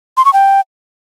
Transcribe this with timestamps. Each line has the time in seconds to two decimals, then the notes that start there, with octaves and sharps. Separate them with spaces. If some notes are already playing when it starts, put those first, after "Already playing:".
0.17 C6
0.25 C#6
0.33 G5